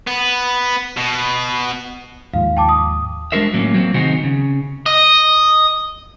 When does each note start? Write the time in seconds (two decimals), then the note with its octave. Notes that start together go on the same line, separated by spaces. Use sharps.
0.07 B3
0.97 B2
2.34 D#2 G#2 F3 F5
2.57 G5 A5 D6
2.69 D#6
3.32 G#3 D4 F#4 A#4 C5 E5
3.53 A2 F#3 A#3 C#4
3.75 F#3 A#3 C4
3.94 C3 D#3 C4 D#4 F#4 G#4
4.24 C#3
4.86 D#5